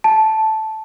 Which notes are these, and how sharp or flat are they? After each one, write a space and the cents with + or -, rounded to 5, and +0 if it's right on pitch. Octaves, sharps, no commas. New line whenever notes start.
A5 -5